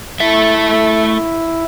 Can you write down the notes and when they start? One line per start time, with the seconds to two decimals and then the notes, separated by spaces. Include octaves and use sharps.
0.20 A3 E4 E5